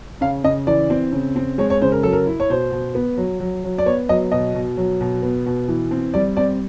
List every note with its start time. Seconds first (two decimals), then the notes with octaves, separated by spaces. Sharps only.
0.21 C#3 F5
0.44 C#3 D#5
0.67 E3 D5
0.90 C4
1.12 C#3
1.36 C4
1.58 G#3 C#5
1.70 C#5
1.81 C#3 C5
1.92 A#4
2.03 F#3 A4
2.12 A#4
2.27 E4
2.40 C#5
2.50 B2 C5
2.72 B2
2.95 B3
3.17 F#3
3.40 F#3
3.64 F#3
3.78 D5
3.86 B3 C#5
4.09 F#3 D#5
4.32 B2 D#5
4.55 B2
4.77 F#3
5.01 B2
5.23 B3
5.46 B2
5.68 E3
5.91 C4
6.14 G3 D5
6.37 C4 D5